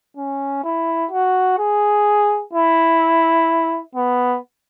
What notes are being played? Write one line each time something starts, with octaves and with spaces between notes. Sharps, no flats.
C#4
E4
F#4
G#4
E4
B3